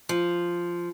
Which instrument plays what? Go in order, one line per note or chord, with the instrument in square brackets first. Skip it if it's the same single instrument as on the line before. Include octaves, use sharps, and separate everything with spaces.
[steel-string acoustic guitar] F3